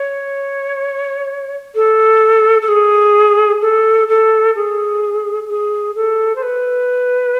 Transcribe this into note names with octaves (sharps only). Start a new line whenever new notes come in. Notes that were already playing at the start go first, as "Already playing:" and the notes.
Already playing: C#5
A4
A4
G#4
A4
A4
G#4
G#4
A4
C5
B4